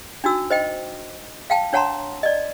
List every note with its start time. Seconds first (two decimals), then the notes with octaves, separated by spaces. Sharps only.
0.24 D4 D#4 F#4 E6
0.50 C5 D#5 G5
1.50 F5 G5 A5
1.73 D4 C#5 F#5 A5 A#5 C6
2.23 D5 D#5